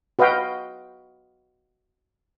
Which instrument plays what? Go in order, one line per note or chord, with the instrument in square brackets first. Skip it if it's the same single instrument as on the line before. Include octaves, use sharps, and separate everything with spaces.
[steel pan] F#4 B4 D#5 F5 G5